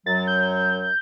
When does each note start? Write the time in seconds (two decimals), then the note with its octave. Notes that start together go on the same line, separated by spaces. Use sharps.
0.06 F#2 F#3 A6
0.27 G6